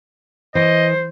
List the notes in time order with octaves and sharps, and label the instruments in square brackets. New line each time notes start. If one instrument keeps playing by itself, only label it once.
[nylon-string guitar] E3 [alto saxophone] C5 [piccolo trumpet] D#5